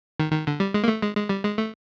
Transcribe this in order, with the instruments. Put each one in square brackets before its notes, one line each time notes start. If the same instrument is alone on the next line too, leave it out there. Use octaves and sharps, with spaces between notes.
[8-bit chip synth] D#3
D#3
D3
G3
G#3
A#3
A3
G#3
G#3
G3
G#3
A3